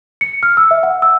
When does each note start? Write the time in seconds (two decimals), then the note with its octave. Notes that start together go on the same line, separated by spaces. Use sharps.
0.21 C#7
0.43 F6
0.57 E6
0.71 E5
0.83 F#5
1.02 E6